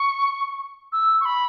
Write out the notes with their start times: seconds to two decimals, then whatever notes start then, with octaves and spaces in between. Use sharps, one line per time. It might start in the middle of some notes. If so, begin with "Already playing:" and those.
Already playing: C#6
0.92 E6
1.21 C#6
1.25 B5